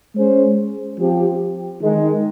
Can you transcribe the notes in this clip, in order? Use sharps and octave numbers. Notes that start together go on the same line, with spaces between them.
G#3 C#4 G#4 C5
F3 C4 G4
D#3 G#3 D#4